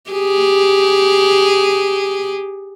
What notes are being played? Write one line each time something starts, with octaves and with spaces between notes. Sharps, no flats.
G4 G#4